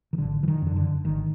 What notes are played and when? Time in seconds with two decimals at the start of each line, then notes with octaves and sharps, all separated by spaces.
0.13 D#3
0.18 G#1 D3
0.43 E3
0.48 D#3
0.62 F#2 D3
0.76 D3
1.05 G#1 D#3